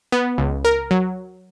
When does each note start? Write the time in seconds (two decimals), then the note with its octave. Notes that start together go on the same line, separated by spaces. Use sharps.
0.12 B3
0.38 C#2
0.65 A#4
0.91 F#3